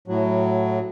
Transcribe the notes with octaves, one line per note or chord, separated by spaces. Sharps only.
A2 F#3